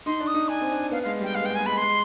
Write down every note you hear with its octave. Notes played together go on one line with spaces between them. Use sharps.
D#4 C6
D4
D#6
D#4
D4 G#5
C4
D4
B3 F5
G#3 F5
G3 G5
G#3 F5
B3
G#3 G5
B3 G#5
G#3 B5
B3
G#3 C6